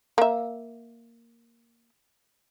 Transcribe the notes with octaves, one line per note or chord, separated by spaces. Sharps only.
A#3 E5